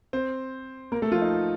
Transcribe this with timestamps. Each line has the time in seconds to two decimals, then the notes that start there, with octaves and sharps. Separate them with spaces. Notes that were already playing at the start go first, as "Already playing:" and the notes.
0.13 C4 C5
0.92 A#3 A#4
1.02 A3 A4
1.11 F3 F4
1.21 D#4